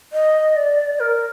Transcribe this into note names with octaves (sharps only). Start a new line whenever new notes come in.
D#5
D5
A#4